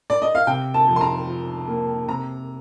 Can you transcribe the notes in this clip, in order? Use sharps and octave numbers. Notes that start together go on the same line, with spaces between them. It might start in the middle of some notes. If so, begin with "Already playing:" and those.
D5
D#5
F5
C3 G5
A5
F2
C6
A#5
F3
A#3
C3 A#5